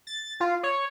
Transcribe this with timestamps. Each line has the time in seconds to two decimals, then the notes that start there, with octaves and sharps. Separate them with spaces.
0.07 A6
0.40 F4
0.63 C#5